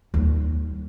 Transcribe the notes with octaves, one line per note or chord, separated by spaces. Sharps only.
D#2 G3